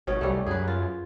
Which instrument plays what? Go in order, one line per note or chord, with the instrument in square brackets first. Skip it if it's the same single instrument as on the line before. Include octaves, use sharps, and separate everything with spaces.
[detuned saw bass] G#1 [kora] B2 C#4
[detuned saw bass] C2 [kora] G3 A3
[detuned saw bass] F#2 [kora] G#4 B4
[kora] F4